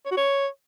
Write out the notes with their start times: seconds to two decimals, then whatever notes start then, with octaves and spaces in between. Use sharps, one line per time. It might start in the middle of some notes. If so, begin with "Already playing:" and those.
0.05 C#5
0.11 F#4
0.17 C#5